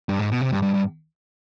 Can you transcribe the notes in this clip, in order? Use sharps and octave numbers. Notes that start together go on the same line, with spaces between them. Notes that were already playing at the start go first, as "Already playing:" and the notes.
G2
G#2
B2
C3
G2
G2
G2